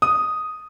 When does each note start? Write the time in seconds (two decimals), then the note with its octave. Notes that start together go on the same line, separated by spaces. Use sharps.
0.02 D#6